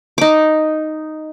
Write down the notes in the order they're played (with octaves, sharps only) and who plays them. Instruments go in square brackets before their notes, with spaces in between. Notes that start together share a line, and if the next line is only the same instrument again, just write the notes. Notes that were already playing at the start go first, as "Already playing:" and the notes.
[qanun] D#4 D6